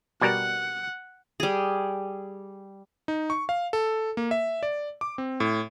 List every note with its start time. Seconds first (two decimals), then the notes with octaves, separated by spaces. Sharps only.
0.21 B2 G3 A#4 F#5
1.40 G3 G#4
3.08 D#4
3.30 C#6
3.49 F5
3.73 A4
4.17 A#3
4.31 E5
4.63 D5
5.01 D6
5.18 C4
5.40 A2